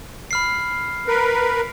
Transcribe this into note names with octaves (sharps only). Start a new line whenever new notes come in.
B5 F6 C7
A#4 B4